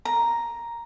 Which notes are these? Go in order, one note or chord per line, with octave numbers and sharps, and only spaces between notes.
A#5